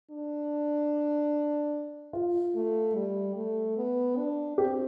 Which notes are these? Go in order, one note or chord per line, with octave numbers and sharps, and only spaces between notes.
D4
F4
A3
G3
A3
B3
D4
C4 G4